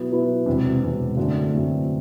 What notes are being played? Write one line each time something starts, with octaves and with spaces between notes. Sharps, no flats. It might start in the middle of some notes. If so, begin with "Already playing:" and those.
Already playing: B2 F#3 B3 E4
B2 F#3 B3 E4
E1 E2 C3
E1 E2 C3
F#2 D3 A3 C4
F#2 D3 A3 C4